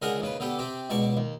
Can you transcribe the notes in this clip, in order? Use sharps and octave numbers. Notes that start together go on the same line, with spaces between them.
C#2 D3 G#4 A#4 F#5
D#2 C#3 B4
D3 B3 G4 A4
C3 C4 G4
C#2 B2 D5 A5 C#6
D#2